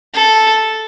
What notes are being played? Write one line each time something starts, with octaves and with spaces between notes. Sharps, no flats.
A4